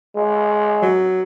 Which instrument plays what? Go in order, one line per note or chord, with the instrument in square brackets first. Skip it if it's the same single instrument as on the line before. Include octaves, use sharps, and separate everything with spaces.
[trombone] G#3
[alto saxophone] F#3